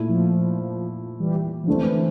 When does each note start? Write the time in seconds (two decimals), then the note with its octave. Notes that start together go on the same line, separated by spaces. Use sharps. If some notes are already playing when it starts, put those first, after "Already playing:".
Already playing: A#2 A3 E4
0.09 F3
1.20 E3 G3
1.64 F3
1.68 D3 E3 A3 C4